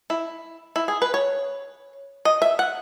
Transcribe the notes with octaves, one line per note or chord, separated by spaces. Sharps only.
E4
E4
G#4
B4
C#5
D#5
E5
F#5